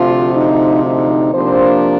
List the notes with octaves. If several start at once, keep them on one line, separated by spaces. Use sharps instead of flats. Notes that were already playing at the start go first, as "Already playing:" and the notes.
Already playing: D2 C3 F3 F4
D#4
D#4
C3 F3 A#3 D4 C5